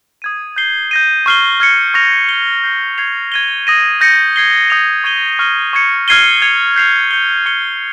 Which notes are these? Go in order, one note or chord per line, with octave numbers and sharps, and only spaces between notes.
D#6 G#6 D#7
G6 C7 G7
G6 A#6 D#7
C#6 F6 C7 G7
F6 G#6 C#7
C#6 F6 A#6 F7
G#6 C#7 G7
G6 C7 G7
G#6 C7 F7
G#6 D#7 G7
D#6 A#6 D#7
G6 A#6 C#7
G#6 C7 G7
D#6 G6 C#7 F7
C#6 G#6 D#7 G7
C#6 F6 A#6 D#7 G7
C#6 G#6 C#7
F6 G#6 C7 D#7 G7
G#6 C#7 F7
G6 C7 F7
G6 C#7 G7
C#6 G6 C#7 G7